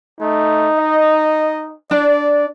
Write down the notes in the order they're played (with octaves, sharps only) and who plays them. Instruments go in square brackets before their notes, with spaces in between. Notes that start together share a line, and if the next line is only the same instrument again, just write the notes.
[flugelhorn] A3 [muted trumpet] D#4
[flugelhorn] D#5
[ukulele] D4 [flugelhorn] D5